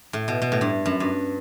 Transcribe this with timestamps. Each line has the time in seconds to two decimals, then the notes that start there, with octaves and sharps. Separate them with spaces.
0.13 A2
0.28 B2
0.42 B2
0.52 A2
0.61 G2
0.86 F#2
1.00 G2